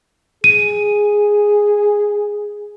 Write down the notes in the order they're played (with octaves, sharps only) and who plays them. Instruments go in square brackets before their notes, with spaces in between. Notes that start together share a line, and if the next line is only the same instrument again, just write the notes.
[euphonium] G#4 [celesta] D#7